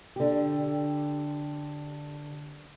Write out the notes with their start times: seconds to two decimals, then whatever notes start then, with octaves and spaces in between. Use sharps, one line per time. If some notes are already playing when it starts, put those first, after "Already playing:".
0.16 D3 G4